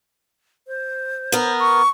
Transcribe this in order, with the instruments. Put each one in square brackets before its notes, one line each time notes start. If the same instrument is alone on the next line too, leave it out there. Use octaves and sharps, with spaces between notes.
[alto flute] C5
[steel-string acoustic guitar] B3 A#4
[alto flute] C#6